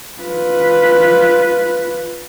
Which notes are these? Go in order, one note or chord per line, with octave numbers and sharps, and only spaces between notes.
F4 B4